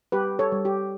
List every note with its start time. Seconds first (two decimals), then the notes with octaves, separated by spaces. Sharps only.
0.12 G3 G4 B4
0.39 A4 C#5
0.52 G3
0.65 G4